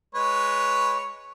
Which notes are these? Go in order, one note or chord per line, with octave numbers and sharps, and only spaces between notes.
G#3 B4 C#5